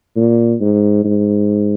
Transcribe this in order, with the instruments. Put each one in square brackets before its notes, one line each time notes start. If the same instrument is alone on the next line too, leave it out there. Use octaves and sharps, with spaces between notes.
[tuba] A#2
G#2
G#2